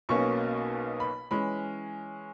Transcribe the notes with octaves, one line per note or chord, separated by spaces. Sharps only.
B1 B2 A#3 C#4 C#6
B5
E3 G#3 C#4 B5